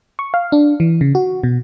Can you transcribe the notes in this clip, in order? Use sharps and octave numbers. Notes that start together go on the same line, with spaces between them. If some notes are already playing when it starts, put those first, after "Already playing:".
C#6
F5
D4
E3
C#3
F#4
B2